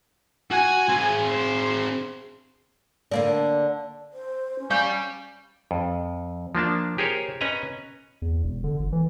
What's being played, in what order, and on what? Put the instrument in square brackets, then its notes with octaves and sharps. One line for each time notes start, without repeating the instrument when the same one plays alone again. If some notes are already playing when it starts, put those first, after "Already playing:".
[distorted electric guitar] F#4 F#5 [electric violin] G#5
[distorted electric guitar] C4 G#4
[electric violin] C5
[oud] D3 A#3 D4
[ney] C5
C#4
[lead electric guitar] G3 [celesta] F5 G#5 C#6 [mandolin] G5
[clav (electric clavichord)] F2
F3 A#3 D4 A5
G4 G#4 A#4 C5 C#5
C#4 B4 D#5 G#5 A#5
[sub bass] E2
E1
D3
G1
E3